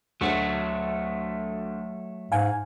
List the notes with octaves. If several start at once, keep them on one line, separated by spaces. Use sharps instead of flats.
D2 F#3 A3
G#2 F5 G#5